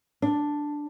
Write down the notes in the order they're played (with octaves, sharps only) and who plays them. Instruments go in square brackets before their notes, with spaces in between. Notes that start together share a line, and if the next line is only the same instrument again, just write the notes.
[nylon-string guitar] D4